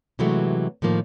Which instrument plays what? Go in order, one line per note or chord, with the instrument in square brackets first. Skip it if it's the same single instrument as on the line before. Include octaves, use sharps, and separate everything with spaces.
[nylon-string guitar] C3 E3 F#3 G#3 A3 F#4
A2 D#3 F3 A#3